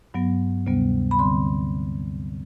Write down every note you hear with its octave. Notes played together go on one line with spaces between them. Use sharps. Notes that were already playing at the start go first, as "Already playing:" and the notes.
G2 F#3 B3
D2 C3 G3 B3
B5
D2 D3 G3 C4 C6